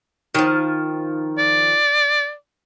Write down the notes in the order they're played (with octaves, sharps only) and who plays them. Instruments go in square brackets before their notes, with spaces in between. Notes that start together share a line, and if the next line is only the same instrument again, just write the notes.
[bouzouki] D#3 F3
[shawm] D5